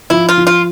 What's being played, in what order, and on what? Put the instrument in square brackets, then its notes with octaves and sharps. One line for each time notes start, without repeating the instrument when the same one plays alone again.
[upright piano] F3 [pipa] E4
[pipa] F4
[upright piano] F3
[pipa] F4